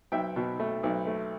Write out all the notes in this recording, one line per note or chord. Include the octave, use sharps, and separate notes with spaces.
B1 E5 G5
B2
A3
B1
A3